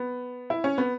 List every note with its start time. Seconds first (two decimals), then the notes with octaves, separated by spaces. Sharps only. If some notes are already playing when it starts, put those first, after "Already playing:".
Already playing: B3
0.50 E4
0.64 C#4
0.78 B3